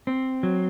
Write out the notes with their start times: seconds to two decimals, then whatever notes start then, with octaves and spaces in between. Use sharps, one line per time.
0.07 C4
0.43 F#3